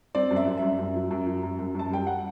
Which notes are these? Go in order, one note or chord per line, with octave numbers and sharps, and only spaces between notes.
C4 D5
F#2
E5
F#2
F#2 E5
F#2
F#3
F#2
F#3
F#2
F#2
F#2 A5
G3 G5
F#5